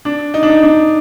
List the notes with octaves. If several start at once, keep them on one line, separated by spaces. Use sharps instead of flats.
D4
D#4
D4
D#4
D4